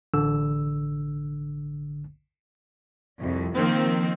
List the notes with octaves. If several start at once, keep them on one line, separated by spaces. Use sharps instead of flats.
A1 D3 E6
C2 F2
D#3 F3 A#3 C4